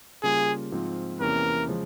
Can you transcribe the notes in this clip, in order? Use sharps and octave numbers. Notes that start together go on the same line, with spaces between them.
C#3 G3 A#3 F4 G#4
G#2 F3 C4 F4
E2 C3 E3 A#3 C#4 A#4
C#3 F3 G#3